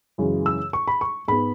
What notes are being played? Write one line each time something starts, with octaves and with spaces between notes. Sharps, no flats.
F#2 C#3 E3 G#3
E6
C#6
B5
C#6
G#2 G#3 B3 B5